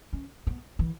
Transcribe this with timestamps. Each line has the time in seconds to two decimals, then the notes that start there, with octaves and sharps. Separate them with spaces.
0.13 C#4
0.47 B3
0.79 E3